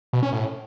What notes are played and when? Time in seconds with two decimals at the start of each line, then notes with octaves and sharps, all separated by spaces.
0.13 B2
0.23 C#4
0.32 A2